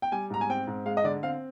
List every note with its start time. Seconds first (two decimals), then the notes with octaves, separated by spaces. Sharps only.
0.02 G5
0.12 G3 G#5
0.30 G#2 A#5
0.41 G#5
0.50 C4 G5
0.67 G#2
0.86 G#3 F5
0.97 D#5
1.04 D3 D5
1.23 C4 F5